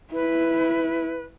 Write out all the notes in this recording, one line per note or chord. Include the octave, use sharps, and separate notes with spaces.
E4 B4